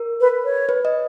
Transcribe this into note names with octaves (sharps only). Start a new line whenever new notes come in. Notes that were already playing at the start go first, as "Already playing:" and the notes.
Already playing: A#4
B4
C#5
B4
D#5